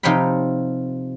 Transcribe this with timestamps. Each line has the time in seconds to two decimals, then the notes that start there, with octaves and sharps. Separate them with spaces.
0.03 C3 F3 D#4 C#5 G5 B5